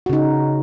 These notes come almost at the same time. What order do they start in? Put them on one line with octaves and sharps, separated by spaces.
F#4 C#3 D#4